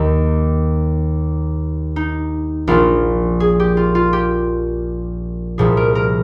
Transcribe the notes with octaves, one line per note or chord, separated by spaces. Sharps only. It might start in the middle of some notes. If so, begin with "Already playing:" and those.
Already playing: D#2 D#3 D#4
D#4
A#1 A#2 F3 F4
G#4
G4
F4
F4
G4
C2 A#2 F3 G#4
A#4
A#4